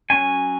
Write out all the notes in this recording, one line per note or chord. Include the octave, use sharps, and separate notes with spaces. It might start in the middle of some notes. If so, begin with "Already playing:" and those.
F#3 C#4 G#5